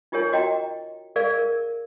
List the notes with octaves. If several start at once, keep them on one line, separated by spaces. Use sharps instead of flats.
D#4 F4 G4 A#4 C#5 G#5
F#4 D#5 G5 A#5
G#4 A#4 D5 F5
A#4